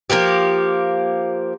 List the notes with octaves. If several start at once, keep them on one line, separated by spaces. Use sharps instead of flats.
F3 A#3 F4 G4